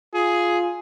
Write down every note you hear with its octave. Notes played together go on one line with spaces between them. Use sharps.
F4 G#4